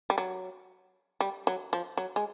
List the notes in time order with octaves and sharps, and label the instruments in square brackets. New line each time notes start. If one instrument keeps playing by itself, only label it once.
[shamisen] G3
F#3
G3
F#3
F3
F#3
G#3